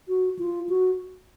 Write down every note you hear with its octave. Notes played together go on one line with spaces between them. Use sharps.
F#4
F4
F#4